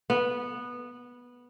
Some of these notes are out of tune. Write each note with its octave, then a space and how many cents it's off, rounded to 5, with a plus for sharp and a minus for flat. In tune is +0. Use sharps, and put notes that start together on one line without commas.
B3 -10